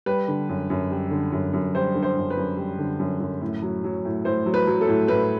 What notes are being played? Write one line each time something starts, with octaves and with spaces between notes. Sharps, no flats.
G3 B4
D3
F#2
F#2
G3
D3
F#2
F#2
G3 C5
D3
C5
F#2
B4
F#2
G3
D3
F#2
F#2
A2
F#3
F#3
A2
A2 C5
F#3
B4
F#3
A4
A2
A2 B4